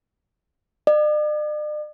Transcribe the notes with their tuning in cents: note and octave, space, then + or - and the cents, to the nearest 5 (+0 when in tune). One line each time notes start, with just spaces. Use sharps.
D5 +45